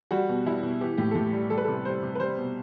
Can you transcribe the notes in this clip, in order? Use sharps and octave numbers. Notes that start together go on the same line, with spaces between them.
G3 F#4
B2
G3 E4
B2
E3 G4
A2 G4
A4
A2 G4
G3
G3 A4
B4
C3 A4
G3 C5
C3
B4
G3 C5
B2